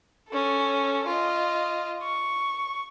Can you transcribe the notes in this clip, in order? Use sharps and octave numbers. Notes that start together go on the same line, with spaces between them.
C#4 A4
F4 D#5
C#6